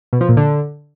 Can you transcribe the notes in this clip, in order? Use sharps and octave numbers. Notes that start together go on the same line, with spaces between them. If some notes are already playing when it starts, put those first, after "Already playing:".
B2
F3
A#2
D3